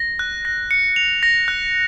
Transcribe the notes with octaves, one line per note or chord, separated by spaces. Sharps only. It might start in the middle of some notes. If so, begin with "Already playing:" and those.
Already playing: A#6
F#6
A#6
C#7
F7
A#6
F#6